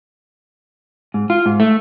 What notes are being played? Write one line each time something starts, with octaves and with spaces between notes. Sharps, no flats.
G#2
F4
G#2
A3